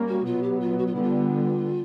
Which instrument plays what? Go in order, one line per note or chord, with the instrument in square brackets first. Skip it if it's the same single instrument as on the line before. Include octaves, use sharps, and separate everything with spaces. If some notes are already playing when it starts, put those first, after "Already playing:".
Already playing: [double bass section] G3 A#3 C#4
[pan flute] F#4
[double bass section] B2 F#3 B3 [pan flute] F4
[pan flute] G4
F4
F#4
F4
[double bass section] D3 G3 B3 [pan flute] E4
[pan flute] F4